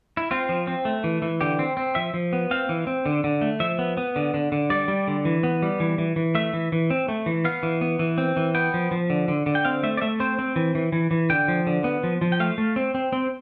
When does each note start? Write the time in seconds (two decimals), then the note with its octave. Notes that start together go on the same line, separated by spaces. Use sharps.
0.17 E4
0.31 C4 F4
0.49 F3
0.67 C4
0.85 A3
1.04 E3
1.22 E3
1.41 D3 G4
1.59 C4
1.77 C4
1.95 F3 E5
2.14 F3
2.33 B3
2.51 C4 F5
2.69 E3
2.87 C4
3.06 D3
3.24 D3
3.41 A3
3.60 F3 E5
3.79 B3
3.97 B3
4.16 D3
4.34 D3
4.52 D3
4.70 G3 D5
4.88 G3
5.08 D3
5.25 E3
5.43 B3
5.62 G3
5.80 E3
5.98 E3
6.16 E3
6.35 A3 E5
6.53 E3
6.72 E3
6.90 C4
7.08 A3
7.26 E3
7.45 B3 F5
7.63 E3
7.81 B3
7.99 E3
8.18 C4
8.37 E3
8.55 B3 G5
8.74 F3
8.91 F3
9.10 D3
9.28 D3
9.46 D3
9.55 G5
9.65 C4 F5
9.83 A3 E5
9.97 D5
10.01 A3 E5
10.20 C4 C5
10.39 C4
10.56 E3
10.75 E3
10.92 E3
11.11 E3
11.30 D3 G5
11.48 F3
11.67 D3
11.84 B3
12.03 F3
12.21 F3
12.32 G5
12.40 A3 F5
12.58 A3
12.76 C4
12.95 C4
13.13 C4